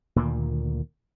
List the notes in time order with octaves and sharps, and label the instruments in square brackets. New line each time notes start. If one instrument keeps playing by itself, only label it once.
[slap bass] D2 A#2 D#3 A#3